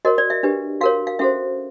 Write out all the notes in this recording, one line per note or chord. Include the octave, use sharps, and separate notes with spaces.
F#4 A#4 C#5 D#5
D5
E5
D4 G4 B4
F#4 A#4 C#5 F5
F5
C#4 F#4 A4 C5 E5